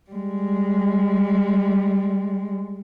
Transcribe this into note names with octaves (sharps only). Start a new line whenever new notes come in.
G3 G#3